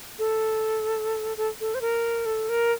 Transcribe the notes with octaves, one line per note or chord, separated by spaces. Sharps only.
A4
A4
A4
C5
A#4
A4
A#4